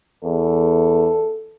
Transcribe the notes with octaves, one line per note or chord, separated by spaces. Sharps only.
E2 A4